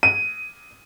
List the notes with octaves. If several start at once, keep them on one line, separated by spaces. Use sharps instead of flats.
D#7